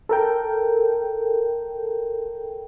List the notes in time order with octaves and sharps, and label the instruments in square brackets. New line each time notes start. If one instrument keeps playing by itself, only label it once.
[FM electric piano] A4 A#4 G5